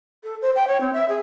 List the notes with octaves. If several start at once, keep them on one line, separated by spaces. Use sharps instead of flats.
A4
C5
G5
C#5
C4
E5
G#4